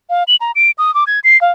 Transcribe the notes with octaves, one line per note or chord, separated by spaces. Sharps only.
F5
F#7
A#5
D7
D#6
D6
G#6
C7
F5